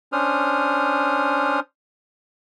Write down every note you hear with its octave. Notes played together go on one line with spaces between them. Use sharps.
C#4 D4 C5 D#6 F6